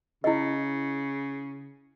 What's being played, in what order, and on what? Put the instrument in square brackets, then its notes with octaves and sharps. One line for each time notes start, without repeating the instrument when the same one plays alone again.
[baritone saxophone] C#3 [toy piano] E4 D#5